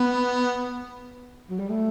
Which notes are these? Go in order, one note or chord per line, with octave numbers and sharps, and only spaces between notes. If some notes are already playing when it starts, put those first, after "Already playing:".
Already playing: B3
F#3
G3
A3